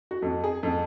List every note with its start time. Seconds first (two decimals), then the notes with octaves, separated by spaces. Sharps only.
0.11 F#4
0.22 F2
0.44 G#4
0.63 F2